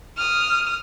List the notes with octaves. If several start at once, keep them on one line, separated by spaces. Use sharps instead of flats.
D#6 F6